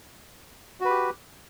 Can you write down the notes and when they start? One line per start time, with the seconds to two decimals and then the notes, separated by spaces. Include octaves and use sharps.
0.81 F#4
0.85 B4
0.90 G4